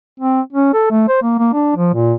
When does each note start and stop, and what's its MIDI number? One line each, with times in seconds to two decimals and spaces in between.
0.20 0.41 60
0.53 0.73 61
0.74 0.88 69
0.91 1.04 57
1.08 1.19 72
1.23 1.35 58
1.39 1.49 58
1.53 1.72 62
1.76 1.93 53
1.94 2.13 46